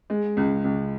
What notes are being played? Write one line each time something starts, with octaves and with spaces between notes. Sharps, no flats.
G#3
C#2
C#2